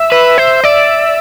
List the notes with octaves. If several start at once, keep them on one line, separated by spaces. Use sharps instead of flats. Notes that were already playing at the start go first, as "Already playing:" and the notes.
Already playing: E5
B4
C5
D5 E5